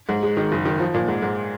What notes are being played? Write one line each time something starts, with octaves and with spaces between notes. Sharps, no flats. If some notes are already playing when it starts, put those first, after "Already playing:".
G#2
G#3
D#3
F#1
D#3
F3
A#2
G#2
G#2